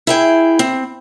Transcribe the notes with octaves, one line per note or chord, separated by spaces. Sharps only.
E4 G#4 G5
C4